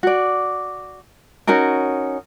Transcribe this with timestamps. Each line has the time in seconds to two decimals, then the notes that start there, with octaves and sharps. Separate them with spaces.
0.03 F#4 D5
1.47 C#4 D#4 F#4 A#4